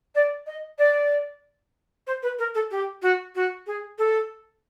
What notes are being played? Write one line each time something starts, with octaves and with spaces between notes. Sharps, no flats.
D5
D#5
D5
C5
B4
A#4
A4
G4
F#4
F#4
G#4
A4